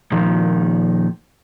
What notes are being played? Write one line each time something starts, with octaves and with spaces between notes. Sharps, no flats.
A#2 D#3 F3